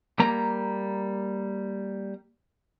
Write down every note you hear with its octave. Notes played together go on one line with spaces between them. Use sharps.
G3 A#3 A#5